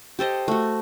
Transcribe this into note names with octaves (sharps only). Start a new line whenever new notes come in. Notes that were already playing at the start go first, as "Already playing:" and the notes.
G4 A4 C5 D#5
A3 F#4